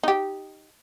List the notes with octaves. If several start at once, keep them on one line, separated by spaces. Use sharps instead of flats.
D#4 G4